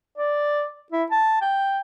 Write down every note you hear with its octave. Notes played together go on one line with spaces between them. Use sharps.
D5
E4
A5
G5